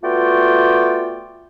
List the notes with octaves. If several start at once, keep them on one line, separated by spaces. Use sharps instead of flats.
A3 B3 F4 F#4 D5 G5